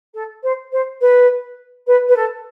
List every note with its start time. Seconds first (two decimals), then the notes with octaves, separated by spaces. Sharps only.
0.14 A4
0.43 C5
0.72 C5
1.01 B4
1.87 B4
2.08 B4
2.16 A4